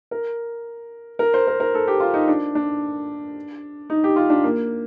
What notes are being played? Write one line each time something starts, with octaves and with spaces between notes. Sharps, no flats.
A#4
A#4
C5
A#4
A#4
A4
G4
F4
D#4
D4
D4
D#4
G4
F4
D4
A#3